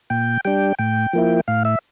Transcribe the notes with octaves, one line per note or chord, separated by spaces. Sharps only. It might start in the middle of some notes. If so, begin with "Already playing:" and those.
A#2 G5
G3 D4 G5
A2 G5
F3 A#3 E4
A2 F5
E5